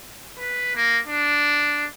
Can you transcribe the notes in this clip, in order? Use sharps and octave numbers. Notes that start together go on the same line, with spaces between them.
B4
A#3
D4